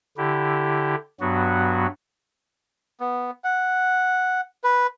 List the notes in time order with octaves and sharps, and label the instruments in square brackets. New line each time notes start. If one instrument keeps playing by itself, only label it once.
[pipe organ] D3 E4 G4
G2 F#3 B3 F#4
[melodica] B3
F#5
B4